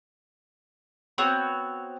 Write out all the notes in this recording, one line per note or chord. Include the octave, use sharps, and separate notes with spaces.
B3 C4 F#4 C#5